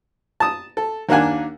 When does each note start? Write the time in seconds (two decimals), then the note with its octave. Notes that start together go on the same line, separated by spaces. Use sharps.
0.40 A5 D#6
0.77 A4
1.09 D#2 A#3 D4 F#5 G#5